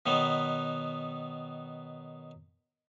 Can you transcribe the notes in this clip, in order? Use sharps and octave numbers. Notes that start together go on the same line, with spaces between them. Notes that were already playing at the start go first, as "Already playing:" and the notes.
B2 D#3 F#3 B3